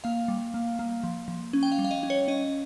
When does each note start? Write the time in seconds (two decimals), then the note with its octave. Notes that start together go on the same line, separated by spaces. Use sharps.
0.04 A#3 F5
0.28 G3
0.54 A#3
0.79 A#3
1.03 F3
1.28 F3
1.53 C#4
1.63 G5
1.72 F5
1.79 G3
1.85 F5
1.91 D#5
2.03 C#4
2.10 C#5
2.28 C#4 D#5